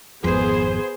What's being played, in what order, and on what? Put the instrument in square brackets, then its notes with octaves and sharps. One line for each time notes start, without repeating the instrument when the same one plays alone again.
[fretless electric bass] G#1 F2 [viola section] B3 G#4 C5